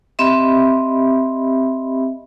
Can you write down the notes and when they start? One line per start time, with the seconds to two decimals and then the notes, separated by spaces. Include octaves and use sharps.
0.19 C4 G4 D#5 E5 B5